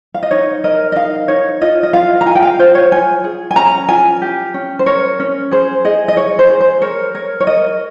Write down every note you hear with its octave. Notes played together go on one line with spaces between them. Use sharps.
F5
D#5
D#4 C#5
A#4 D#5
D#5
D#4 F5
D#4 C#5
F4 D#5
D#5
F4 F5
A#5
F4 G#5
G5
F5
F4 C5
C#5
F4 G#5
G#4
G#5
C#4 A#5
F4 G#5
G4
C#4
C5
A#4 C#5
C#4
G#4 C5
G#4 D#5
D#5
G#4 C#5
C5
G#4
C5
A#4 C#5
A#4 C#5
C#5
A#4 D#5